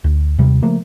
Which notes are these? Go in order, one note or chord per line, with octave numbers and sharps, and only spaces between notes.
D2
D#2 C3 G3
C#3 F3 A3 A#3